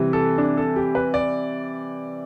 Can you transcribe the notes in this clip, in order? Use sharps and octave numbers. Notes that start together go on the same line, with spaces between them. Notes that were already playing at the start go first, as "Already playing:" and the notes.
Already playing: C3 E3 G3
A4
D4
A4
G4
B4
D5